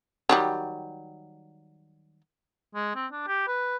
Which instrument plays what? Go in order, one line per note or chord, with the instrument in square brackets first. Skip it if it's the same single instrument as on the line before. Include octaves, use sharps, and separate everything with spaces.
[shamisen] D#3 F#3 G3
[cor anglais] G#3
C4
D4
G4
B4